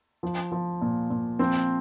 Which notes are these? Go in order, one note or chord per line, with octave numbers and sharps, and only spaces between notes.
F3
F3
A#2
A#2
F3 C4